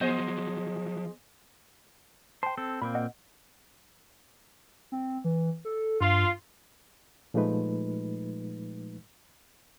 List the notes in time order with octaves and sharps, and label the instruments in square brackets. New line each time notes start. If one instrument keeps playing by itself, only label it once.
[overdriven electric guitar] F3 F#3 [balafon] B3 [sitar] G#4 C5 D#5
[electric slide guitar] C5 [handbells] G5 A5
[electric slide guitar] C4 A4
[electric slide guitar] A#2 A#3 C4 [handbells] B5
[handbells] D#5 F#5
[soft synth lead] C4
E3
A4
[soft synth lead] G2 [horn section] F4
[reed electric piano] A#2 F3 G#3 A3 D#4 B4